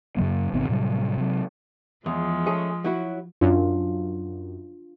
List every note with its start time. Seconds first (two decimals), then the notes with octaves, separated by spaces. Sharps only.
0.17 F#2 C#3 F#3 A#3
0.53 G1 B2 D#3 C4
0.69 A2 C3 F#3 G3
1.17 C3 F#3
2.06 E2 F3 G#3
2.46 A3 C#4 G#4
2.84 F#3 E4 F#4
3.41 F#2 D4 F4